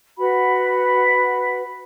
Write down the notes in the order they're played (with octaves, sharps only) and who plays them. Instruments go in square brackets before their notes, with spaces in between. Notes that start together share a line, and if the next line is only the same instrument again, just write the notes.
[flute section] F#4 B4 F#5 B5